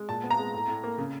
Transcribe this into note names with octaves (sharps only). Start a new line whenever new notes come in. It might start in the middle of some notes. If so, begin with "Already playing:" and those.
Already playing: G#3
A#2 A5
B3
A#5
G#3
A2
A2
A#3
C#3